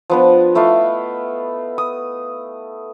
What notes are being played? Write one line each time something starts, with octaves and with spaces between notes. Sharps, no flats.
F3 B3 D4
A3 E4 D#5 F5
D#6